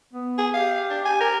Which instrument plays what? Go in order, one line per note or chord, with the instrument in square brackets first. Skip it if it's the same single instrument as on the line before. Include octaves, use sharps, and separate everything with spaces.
[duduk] B3
[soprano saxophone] G#4
[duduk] G4 [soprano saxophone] F5
[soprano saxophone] D4
G#5
A#4